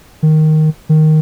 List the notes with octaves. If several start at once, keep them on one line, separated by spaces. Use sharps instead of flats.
D#3
D#3